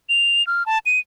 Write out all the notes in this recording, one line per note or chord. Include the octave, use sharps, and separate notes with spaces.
F7
F6
A5
D#7